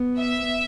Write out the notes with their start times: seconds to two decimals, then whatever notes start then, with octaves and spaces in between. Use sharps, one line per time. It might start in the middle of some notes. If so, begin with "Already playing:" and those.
Already playing: B3
0.18 E5